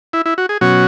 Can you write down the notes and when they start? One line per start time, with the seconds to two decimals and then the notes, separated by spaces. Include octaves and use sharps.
0.13 E4
0.26 E4
0.38 F#4
0.49 G#4
0.61 B2 F#3 C#4 F#4